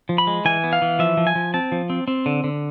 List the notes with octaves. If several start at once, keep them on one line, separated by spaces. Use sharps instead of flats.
F3
B5
G#3
E3 G#5
B3
F5
E3
F3 E5
F3
G#5
F3
C4 A5
F3
C4
C4
D3
D3